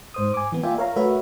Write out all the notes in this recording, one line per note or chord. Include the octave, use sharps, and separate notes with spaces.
G#2 C5 D#6
G#5 D6
E3 B3
A#3 F4 D5 E5 G5 G#5
A#4 C#5 F5 A#5
A3 F#4 A#4 B4 C#5 E5